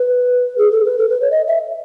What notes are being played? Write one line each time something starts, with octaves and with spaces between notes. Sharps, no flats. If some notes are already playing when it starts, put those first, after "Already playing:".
Already playing: B4
G#4
A4
B4
A4
B4
C#5
D#5
E5